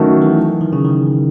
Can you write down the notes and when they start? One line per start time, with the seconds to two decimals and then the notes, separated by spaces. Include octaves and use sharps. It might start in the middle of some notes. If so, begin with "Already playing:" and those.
Already playing: D#3 F#3 A3 C#4 F#4
0.22 E3
0.61 D#3
0.73 C#3
0.85 D#3